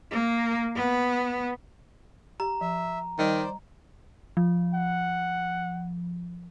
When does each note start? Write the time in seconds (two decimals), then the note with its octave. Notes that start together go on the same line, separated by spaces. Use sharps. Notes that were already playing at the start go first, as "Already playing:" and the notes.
0.11 A#3
0.75 B3
2.40 G4 A#5
2.61 F3 E5
3.19 D#3 G3 C5 D5 D#5
4.37 F3
4.74 F#5